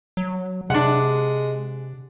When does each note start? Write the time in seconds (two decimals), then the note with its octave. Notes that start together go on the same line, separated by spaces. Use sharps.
0.17 F#3
0.70 C3 G#3 D4 F#5